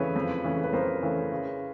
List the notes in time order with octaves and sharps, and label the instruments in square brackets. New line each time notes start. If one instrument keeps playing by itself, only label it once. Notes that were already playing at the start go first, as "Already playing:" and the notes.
Already playing: [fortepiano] F2 C#3 E3 A3 C#4 [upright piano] B4 C#5
[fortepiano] F2
C#3 E3 A3 C#4
[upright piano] B4
[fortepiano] F2 [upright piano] A#4 C5
[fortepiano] C#3 E3 A3 C#4
C#3